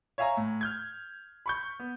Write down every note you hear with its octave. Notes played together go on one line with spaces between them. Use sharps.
C#5 E5 F5 G#5 A#5
A2
F6 G6 G#6
B5 C#6 G6
B3